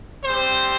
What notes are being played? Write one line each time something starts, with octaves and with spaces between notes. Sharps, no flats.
G3 C4 G4 C5